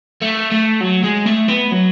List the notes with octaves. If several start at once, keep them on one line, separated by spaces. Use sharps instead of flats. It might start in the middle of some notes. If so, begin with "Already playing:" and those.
A3
A3
F#3
G#3
A3
B3
F#3